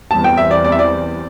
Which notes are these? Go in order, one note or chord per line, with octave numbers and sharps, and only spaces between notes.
E2 E3 G3 C4 A5
G5
E5
D5
D5
E5
D5